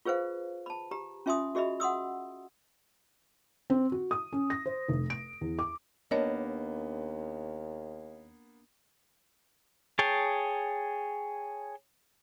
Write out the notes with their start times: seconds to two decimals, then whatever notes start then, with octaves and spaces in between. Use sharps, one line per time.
0.05 F4 G#4 B4 C5 F5
0.66 A5 B5
0.91 G4 A#5
1.26 C#4 F4 E5 G#5 C6 D#6
1.55 F#4 G#4 D#5 E5 B5
1.80 F#5 C6 D#6 E6
3.70 C4
3.92 F#4
4.11 D#6
4.33 C#4
4.50 A#6
4.66 C5
4.88 F1
5.10 D7
5.41 E2
5.59 D6
6.11 D#2 A#3 B3 D4 A#4 C#5 D#5 A5
9.99 G#4 C#5 G5 A5